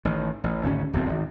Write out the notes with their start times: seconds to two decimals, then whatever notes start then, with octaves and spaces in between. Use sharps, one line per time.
0.05 A1 D#3
0.44 A1
0.63 G#1 D2 C#4
0.93 D1 B1 F2 C4
1.09 G#1